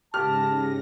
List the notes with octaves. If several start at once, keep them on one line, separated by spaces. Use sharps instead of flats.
G#2 C#3 G4 A5 F6 A#6